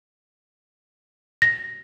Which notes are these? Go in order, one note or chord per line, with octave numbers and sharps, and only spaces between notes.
A#6